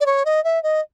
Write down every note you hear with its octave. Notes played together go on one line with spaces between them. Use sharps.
D5
C#5
D#5
E5
D#5